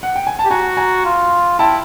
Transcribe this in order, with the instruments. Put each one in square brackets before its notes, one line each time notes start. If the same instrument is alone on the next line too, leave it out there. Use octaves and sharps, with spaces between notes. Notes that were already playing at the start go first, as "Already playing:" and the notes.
[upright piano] F#5
G5
G#5
A5
[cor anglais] G4
[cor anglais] F#4 [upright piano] G#5 A#5
[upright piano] G#5 A#5
[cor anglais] F4
[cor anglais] E4 [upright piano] G5 A5